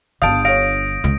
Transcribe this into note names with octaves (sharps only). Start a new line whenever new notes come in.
G1 D3 F5 A5 D#6 G6 D7
C#5 F5 A#6 D7
C#2